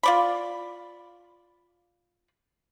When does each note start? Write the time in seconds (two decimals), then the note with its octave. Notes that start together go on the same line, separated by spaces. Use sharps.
0.03 F4 D5 B5